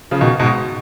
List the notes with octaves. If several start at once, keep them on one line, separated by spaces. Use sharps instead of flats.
C#3 F3
B2 D#3
G#2 B2